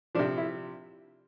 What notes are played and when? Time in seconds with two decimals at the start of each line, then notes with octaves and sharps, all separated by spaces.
0.15 F3 D4
0.19 C3
0.37 E4